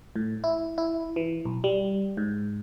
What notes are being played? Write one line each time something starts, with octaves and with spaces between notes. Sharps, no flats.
A2
E4
E4
E3
B1
G3
G#2